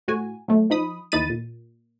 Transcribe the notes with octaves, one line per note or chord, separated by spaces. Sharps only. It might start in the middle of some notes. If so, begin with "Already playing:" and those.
A2 F#4 G#5
F#3 A3
F3 D#4 B5 D#6
D#2 E3 D#4 B5 A6 D#7
A#2